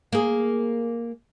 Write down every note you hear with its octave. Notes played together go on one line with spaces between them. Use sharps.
A#3 G#4